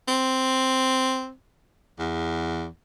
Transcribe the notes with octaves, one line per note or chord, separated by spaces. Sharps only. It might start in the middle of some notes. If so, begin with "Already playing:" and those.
C4
E2